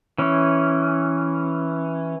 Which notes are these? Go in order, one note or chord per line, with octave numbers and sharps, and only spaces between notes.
E3 C#4